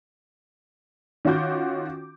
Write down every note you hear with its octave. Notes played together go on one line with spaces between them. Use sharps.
D#3 C#4 F4 F#4 D6 G6